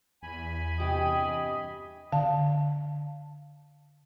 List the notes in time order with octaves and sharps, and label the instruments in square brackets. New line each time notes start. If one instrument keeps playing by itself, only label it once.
[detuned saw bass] E2 [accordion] G#5 B5
[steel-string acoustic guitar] G2 C3 G4 [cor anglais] D#5
[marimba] D3 F5 A5